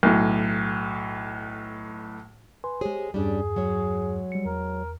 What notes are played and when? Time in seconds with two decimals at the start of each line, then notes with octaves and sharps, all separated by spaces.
0.03 B1 A2
2.64 B4 G#5 C6
2.81 G#3 G4 G#4 C5 C#5
3.14 E2 G2 G3 C#4 D4 G#4
3.56 F#3 G#3 C#5
4.32 G3 C#7
4.46 E2 A#4